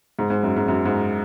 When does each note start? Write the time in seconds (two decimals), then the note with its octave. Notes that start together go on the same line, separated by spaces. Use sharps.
0.19 G#2
0.30 G#2
0.43 F#2
0.56 G#2
0.68 F#2
0.86 G#2